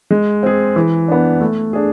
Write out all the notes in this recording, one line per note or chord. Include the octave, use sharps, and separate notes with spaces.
G#3
C4 G#4
E3
B3 D4
A3
D4 G#4